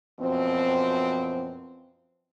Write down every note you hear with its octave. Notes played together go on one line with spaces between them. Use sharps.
F#2 B2 F3 C4